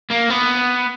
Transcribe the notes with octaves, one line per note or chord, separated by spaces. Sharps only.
A#3
B3